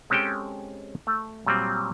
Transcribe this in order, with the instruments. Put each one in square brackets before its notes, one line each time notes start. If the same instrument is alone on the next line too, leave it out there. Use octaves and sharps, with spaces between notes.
[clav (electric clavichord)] G#3 C4 C#4 G4 A4 G5
A3
A#2 F#3 G3 C4